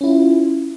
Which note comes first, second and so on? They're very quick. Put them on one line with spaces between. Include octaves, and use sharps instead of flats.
C#4 E4 F4